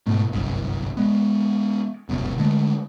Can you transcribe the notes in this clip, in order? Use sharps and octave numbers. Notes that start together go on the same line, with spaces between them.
G#2 B2 A3
G1 C2 F#2
G#3 B3
F1 C#2 F#2 B2
D3 G#3 A3